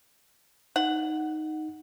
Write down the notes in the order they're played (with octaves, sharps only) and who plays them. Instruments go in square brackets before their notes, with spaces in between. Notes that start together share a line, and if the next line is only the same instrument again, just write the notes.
[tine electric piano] D#4 [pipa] F#5